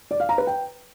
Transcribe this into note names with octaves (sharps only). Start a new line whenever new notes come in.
D5
F5
A#5
B4
G5